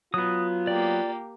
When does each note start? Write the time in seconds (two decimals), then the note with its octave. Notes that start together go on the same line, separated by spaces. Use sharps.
0.14 F#3 B3 F4 D#6
0.67 A#3 G4 D5